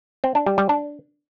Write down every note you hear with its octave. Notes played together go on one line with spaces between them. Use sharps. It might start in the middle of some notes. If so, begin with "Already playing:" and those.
C4
D4
G3
G3
D4